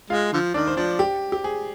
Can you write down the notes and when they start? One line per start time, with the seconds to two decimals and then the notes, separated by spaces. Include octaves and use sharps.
0.10 G#3 F4 F5
0.33 D3 F3
0.54 D#3 D4 D5
0.67 C5
0.77 F3 D4 D5
0.99 G4
1.32 G4
1.44 G#4